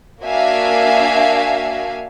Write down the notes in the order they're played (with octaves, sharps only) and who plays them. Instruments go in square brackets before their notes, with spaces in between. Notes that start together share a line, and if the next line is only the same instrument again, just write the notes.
[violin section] A#3 D4 F#4 E5 F5 G#5